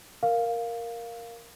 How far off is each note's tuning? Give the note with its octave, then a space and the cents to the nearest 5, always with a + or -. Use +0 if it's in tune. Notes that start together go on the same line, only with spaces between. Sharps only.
A#4 +0 F5 +0